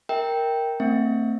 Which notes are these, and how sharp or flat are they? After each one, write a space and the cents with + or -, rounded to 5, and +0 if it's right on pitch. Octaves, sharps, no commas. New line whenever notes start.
A#4 +0 E5 -25 G5 +0
A3 +35 C4 +0 E5 +0